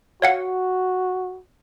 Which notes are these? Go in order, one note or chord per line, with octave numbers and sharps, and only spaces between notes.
F#4 C#5 F5 F#5